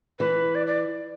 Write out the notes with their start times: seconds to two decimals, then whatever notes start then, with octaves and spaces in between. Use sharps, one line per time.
0.19 E3 B4
0.55 D5
0.67 D5